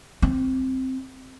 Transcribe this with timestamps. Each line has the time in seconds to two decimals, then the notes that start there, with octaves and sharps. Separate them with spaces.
0.22 C4